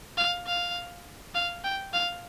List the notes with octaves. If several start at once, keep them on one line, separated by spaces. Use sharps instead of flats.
F5
F5
F5
G5
F5